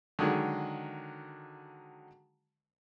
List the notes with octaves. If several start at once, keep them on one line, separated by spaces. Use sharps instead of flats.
D3 D#3 F#3 G#3